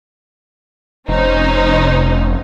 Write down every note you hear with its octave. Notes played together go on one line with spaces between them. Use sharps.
F1 C#4 D#4 C5